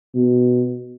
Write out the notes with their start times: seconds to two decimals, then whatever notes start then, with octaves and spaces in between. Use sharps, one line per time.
0.15 B2